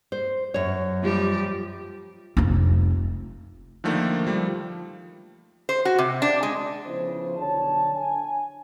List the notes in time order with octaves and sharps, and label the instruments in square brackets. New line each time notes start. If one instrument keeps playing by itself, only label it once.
[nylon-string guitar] C5
F#2 C#5
[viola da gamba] F3 G3 G4
[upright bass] F1 C4
[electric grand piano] D3 D#3 F3 A3 A#3
F3 G3
[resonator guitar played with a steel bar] C5
F#4
C3
D4
G#3
[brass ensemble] C#3 F3 B3 E4 C5
B1 D3 D4 C#5 A5
G#5